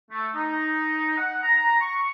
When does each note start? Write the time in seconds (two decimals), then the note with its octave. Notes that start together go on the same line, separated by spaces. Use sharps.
0.11 A3
0.35 D#4
1.17 F#5
1.43 A#5
1.81 C#6